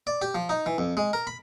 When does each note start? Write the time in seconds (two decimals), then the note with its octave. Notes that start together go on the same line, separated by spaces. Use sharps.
0.07 D5
0.22 G4
0.35 F3
0.49 D#4
0.66 E3
0.78 F2
0.97 G#3
1.13 A#4
1.27 B5